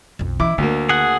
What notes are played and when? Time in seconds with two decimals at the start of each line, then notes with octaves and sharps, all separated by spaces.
0.19 B1 F2
0.40 E3 E4 D6
0.58 D2 D3 A#3
0.89 G#4 F#5